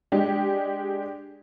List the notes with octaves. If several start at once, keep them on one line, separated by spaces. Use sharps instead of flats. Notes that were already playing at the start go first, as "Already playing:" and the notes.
G#3 D4 G4